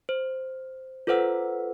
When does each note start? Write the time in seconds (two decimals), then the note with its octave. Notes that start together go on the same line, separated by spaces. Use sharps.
0.09 C5
1.07 F4 A4 B4 C5 F#5 E6